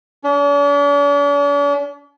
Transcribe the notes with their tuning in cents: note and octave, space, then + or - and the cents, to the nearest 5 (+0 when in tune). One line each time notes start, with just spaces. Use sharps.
D4 -45